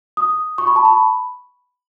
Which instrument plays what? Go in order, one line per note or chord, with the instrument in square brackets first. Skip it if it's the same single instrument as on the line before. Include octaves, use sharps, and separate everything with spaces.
[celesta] D#6
C#6
B5
A5
B5